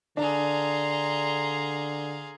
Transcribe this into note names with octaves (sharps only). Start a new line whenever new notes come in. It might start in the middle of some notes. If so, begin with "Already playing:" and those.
D3 D4 G#4 F5 A#5 C6